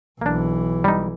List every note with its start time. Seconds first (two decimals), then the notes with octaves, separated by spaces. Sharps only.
0.21 B1 E3 A#3 D4
0.84 G3 D#4